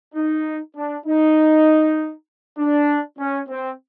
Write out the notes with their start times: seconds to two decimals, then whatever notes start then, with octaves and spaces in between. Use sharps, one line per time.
0.15 D#4
0.75 D4
1.06 D#4
2.58 D4
3.18 C#4
3.49 C4